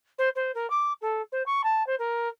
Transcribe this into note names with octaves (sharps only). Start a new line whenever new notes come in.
C5
C5
A#4
D6
A4
C5
C#6
A5
C5
A#4